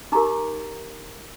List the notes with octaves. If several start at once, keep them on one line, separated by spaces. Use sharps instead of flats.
D#4 G4 A#4 A#5 D6